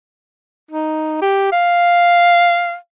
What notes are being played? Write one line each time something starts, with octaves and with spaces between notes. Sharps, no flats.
D#4
G4
F5